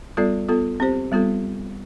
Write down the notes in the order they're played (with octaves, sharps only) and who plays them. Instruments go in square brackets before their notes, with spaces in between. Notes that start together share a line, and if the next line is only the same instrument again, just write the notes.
[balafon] G3 B3 F4 A4 D5
B3 F4 A4
C4 G4 C5
G3 B3 F4 A4